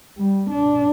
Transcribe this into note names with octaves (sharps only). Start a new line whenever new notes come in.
G3
D4